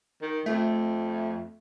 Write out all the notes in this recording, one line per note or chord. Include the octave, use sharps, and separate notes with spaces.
D#3
F2 A3